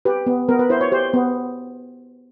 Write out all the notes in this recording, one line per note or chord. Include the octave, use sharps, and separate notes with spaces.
G4 B4
B3
B3 A#4
B4
E4 C5
C#5
G4 C5
B3